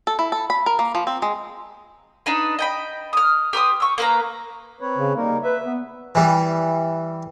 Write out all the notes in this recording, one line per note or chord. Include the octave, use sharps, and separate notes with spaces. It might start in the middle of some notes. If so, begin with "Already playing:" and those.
A4
E4
A4
B5
A#4
A#3
F3
C4
G#3
D4 D#4 B4
D#5 G5 B5
D#6 F6
G4 B4 C6 D#6
C#6 E6
A#3 B4 A#5
C4 B4 C#5
C#3
G3 A#3 D#4 A#4
B4 E5
B3
E3 G3